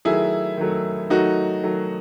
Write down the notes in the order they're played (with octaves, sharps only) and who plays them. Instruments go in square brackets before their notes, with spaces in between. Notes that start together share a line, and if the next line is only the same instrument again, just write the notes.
[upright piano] D#3 F#3 A3 E4 G#4
D#3 F#3 A3
D#3 F#3 A3 D#4 F#4
D#3 F#3 A3